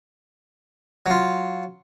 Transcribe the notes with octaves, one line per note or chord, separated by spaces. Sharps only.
F#3 F4